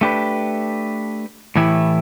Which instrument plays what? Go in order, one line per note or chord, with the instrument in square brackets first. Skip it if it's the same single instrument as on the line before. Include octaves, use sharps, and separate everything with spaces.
[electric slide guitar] A3 D4 G4 B4
A2 E3 A3 E4 G4